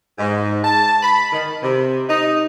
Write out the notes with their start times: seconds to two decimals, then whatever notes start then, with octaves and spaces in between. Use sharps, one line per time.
0.19 G#2
0.63 A5
1.01 B5
1.32 D#3
1.62 C3
2.09 D#4